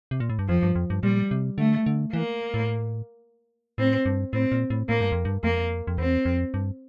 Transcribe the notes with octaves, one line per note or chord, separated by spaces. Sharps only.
C3
A#2
A2
G2
F2 F3
G2
F2
G2
A#2 G3
C3
D3 A3
D3
E3 A#3
A2
A2 C4
G2
A2 C4
A#2
A2
A2 A#3
G2
F2
G2
F2 A#3
F2
E2 C4
F2
G2